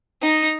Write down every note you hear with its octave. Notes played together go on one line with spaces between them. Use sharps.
D#4